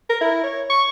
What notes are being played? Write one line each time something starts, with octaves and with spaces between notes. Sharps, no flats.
A#4
E4
C#5
C#6